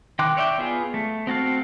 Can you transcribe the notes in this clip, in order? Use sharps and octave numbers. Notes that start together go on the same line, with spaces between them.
D#3 G5 C6 D6 F#6
C#5 D5 E5 F#5 G5
B3 F4 G#4
A3
C4 F#4 A4 F5